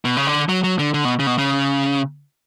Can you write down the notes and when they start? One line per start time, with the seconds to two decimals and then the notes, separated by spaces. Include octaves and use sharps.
0.05 B2
0.17 C#3
0.27 D3
0.49 F#3
0.63 F#3
0.79 D3
0.94 D3
1.05 B2
1.19 C#3
1.27 B2
1.38 C#3